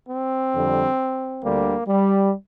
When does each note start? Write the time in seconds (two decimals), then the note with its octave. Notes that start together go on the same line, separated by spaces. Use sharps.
0.09 C4
0.53 F2 D3 G3
1.42 D2 D3 G3 A#3
1.87 G3